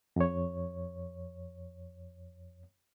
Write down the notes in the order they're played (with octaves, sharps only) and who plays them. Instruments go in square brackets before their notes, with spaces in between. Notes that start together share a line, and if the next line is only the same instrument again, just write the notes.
[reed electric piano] F2 C#5